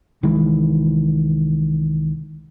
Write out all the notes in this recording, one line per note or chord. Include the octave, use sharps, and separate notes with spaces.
C2 D#3 E3 G#3